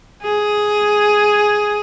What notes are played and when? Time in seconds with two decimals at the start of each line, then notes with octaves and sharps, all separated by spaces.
0.23 G#4